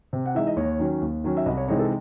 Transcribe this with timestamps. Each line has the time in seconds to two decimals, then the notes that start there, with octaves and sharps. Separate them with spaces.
0.13 C3
0.26 F#5
0.35 E3 G#3 D#4 E5
0.47 D#5
0.56 D#2 C#5
0.79 D#3 F#3 C#4
1.01 D#2
1.24 D#3 F#3 C#4
1.37 E5
1.46 C2 D#5
1.57 C#5
1.68 C3 E3 G#3 D#4 C#5
1.79 A4